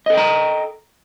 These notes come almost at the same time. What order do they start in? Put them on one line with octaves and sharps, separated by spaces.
D#5 A4 G5 A#5